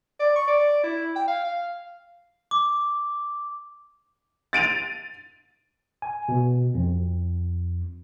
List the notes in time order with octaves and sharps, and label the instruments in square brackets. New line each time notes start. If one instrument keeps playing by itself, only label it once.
[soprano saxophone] D5
C#6
D5
E4
G5
F5
F5
[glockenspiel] D6
[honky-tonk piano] A6 D7 D#7 F7
[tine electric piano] G#5
B2
F2